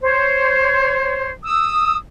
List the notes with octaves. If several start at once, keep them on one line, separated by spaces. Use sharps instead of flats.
C5 C#5
D#6 E6